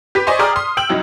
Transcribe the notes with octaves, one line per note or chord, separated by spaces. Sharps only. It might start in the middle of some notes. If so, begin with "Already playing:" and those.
G4 B4 B6
C5 D5 D#5 G#5 C6 C#6
G#4 D5 G5 A#5 D#6 F6
C6 D#6
G5 E6 F#7
C2 F#3 D#4